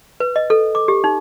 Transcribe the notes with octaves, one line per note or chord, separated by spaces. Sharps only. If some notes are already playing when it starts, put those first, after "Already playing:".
B4
D#5
A4
D6
G4
D#4